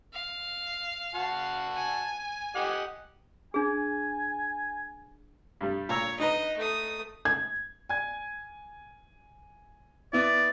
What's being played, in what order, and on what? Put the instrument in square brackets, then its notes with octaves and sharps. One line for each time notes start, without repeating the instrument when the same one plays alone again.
[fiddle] F5
[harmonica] F#4 F#5 A5
[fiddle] G#5
[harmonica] G4 D#5 F#5
[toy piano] D4 G#4 [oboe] G#5
[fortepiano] G2 G3
[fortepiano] A#2 A#5 E6 [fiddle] C#5
[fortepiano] D#4 B4 A#5 [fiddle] D#5
[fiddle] A3 D#6
[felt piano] G#6
[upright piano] G#5 G#6
[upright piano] B3 E4 [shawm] D5